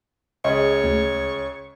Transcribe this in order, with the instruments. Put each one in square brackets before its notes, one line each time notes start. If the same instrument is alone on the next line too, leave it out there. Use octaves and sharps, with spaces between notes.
[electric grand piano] C#2 G#4 [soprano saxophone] C#5 [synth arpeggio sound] D#5
[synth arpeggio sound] D2